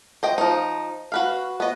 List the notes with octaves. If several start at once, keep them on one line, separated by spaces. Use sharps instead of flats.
C5 D#5 G5
F3 D#4
F#4 B4 F5
B3 D#5